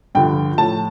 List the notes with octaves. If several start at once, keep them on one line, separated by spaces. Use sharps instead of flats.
G2 D3 F3 G5
A2 F3 A5